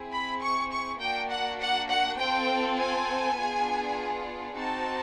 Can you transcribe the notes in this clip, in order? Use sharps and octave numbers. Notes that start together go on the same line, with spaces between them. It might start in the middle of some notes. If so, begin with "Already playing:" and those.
Already playing: C4 E4 G#4
B5
C#6
C#6
A#3 D4 F#4 G5
F#5
F#5
F#5
C4 F4 A4 G5
G#5
B3 D4 F4 G#4
C4 D#4 F#4 A5